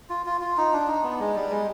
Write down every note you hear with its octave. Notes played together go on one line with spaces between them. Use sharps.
F4
F4
F4
D#4
D4
D#4
B3
G#3
G3
G#3